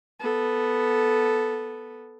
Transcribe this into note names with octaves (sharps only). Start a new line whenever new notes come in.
B3 A4